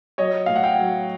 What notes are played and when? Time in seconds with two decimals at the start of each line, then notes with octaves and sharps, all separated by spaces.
0.18 F#3 C#5 D#5
0.46 A2 F5
0.56 F#5
0.64 F5 G5
0.79 F#3